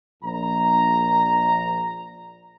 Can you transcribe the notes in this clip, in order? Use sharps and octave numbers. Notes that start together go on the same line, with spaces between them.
A#1 A#5